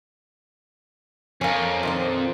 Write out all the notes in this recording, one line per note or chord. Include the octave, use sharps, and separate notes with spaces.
F2 A#3 C#4
A#2 D#3 C4